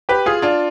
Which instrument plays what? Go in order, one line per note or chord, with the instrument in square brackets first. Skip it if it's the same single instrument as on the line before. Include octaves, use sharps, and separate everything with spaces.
[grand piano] G4 B4
F4 G#4
D4 F4